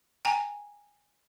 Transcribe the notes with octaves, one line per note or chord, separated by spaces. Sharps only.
G5 G#5 A#5